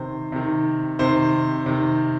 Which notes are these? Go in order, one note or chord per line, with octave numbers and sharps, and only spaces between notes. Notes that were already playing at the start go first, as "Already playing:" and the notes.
Already playing: C3 D#3 C5
C3 D#3
C3 D#3 C5
C3 D#3